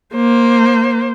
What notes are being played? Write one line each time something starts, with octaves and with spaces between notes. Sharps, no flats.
A#3 C5